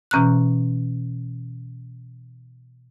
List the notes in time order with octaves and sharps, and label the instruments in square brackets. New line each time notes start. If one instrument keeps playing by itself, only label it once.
[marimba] B2 E3 C#4 A#5 F6 F#6